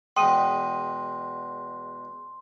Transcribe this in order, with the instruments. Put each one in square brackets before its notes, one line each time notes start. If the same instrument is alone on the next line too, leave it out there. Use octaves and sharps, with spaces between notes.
[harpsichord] E2 B2 G#3 [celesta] G5 D#6 D#7 [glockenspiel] C6